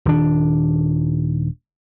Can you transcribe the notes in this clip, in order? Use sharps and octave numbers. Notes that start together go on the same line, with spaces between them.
D#1 D#3 D4